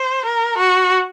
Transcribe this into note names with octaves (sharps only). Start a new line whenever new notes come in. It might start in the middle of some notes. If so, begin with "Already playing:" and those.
Already playing: C5
A#4
F#4